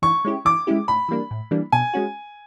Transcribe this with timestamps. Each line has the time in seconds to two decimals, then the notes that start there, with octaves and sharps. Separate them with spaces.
0.02 E3 C#6
0.25 G#3 C#4 E4 G4
0.45 E3 D6
0.67 G#3 C#4 E4 G4
0.88 A2 B5
1.08 E3 G3 A#3 D4
1.31 A2
1.51 E3 G3 A#3 D4
1.72 B2 G#5
1.93 G#3 C#4 F#4